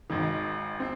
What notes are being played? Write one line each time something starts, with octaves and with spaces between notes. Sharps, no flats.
G#1 G#2 D#3
C4